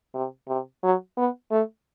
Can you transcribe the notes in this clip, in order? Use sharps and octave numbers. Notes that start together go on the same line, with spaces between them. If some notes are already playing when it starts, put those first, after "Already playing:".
C3
C3
F#3
B3
A3